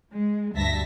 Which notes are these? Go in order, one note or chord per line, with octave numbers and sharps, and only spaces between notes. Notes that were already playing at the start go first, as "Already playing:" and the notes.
G#3
D2 G2 E5 A5 A#6 B6